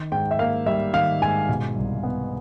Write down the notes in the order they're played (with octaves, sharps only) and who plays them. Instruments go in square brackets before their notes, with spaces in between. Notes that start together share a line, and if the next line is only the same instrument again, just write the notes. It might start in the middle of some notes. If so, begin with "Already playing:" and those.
Already playing: [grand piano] D#3
G#2 G5
E5
A#3 F5
G3 E5
D#3 F5
G#2 G#5
B2
C2
B3